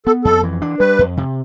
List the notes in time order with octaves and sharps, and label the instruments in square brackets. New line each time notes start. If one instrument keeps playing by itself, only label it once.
[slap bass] B3 [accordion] A4
[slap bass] F2 [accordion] A4
[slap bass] E3
D4
[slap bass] G3 [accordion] B4
[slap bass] F2
C3